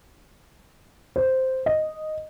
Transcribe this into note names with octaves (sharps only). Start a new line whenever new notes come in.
C5
D#5